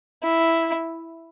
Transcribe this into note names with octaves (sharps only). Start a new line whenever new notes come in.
E4